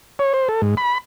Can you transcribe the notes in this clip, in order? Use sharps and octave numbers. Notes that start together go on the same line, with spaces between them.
C#5
C5
A4
G#2
B5